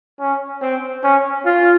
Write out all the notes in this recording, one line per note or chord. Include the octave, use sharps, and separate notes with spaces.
C#4
C4
C#4
F4